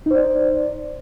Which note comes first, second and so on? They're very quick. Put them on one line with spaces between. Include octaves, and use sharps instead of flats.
D#4 C5 D5